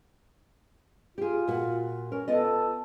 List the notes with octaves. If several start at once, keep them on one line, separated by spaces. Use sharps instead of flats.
F4 G4 G#4
A#2 F#4
C#4 A#4
B3 F4 A4 D#5